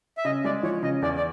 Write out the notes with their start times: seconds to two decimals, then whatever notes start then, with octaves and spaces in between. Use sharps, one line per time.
0.17 E5
0.25 C#3 D#5
0.44 G#3 D5
0.63 F3 C#5
0.83 C#3 D#5
1.02 E2 D5
1.17 D5